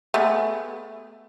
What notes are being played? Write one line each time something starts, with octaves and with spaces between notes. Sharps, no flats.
A3 B3 G#4